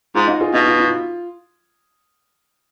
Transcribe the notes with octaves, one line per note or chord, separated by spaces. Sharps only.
G#2 F4
D#4 F#4
F4 G#4
B2 D#4 F#4
F4
F4